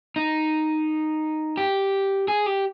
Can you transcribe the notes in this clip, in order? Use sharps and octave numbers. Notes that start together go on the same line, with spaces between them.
D#4
G4
G#4
G4